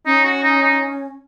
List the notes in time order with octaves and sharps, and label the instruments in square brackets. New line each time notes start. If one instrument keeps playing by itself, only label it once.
[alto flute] C#4 [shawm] D#4
[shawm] F#4
D#4
D#4